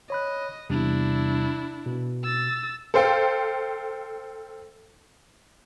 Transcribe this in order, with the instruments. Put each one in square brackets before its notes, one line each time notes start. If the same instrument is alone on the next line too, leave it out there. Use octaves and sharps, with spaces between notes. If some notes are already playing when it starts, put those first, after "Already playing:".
[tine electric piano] C#5 B5 F#6 [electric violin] D#5
[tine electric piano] E2 C3 G3 [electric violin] D4 E4
[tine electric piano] B2
[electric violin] E6 A6
[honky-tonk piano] A4 C5 F5 G5